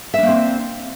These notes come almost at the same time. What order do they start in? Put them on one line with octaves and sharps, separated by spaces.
E5 D4 A#3 C4